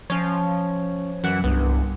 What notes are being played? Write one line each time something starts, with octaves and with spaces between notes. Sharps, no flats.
F3 C#4 C#5
F#2 E3 F#5
C2 G2 B3